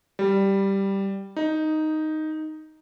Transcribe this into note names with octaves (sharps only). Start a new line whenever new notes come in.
G3
D#4